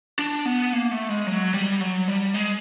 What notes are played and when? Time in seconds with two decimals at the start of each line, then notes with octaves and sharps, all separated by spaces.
0.19 D4
0.45 B3
0.73 A#3
0.91 A3
1.09 G#3
1.27 F#3
1.54 G3
1.81 F#3
2.08 G3
2.34 G#3